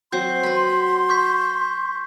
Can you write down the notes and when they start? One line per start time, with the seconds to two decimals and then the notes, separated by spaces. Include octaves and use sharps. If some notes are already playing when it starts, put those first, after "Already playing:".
0.12 F#3 C4 F#4 C6 G6 C7
0.43 B4 B5
1.09 C#6 G6 B6